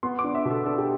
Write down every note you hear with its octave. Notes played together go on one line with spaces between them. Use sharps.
B3 C6
D6
D4
E5
B2
A4
D4 A4
G4